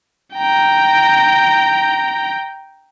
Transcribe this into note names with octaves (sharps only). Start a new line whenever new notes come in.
G5 A#5